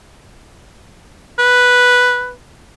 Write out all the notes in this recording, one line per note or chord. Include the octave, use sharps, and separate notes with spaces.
B4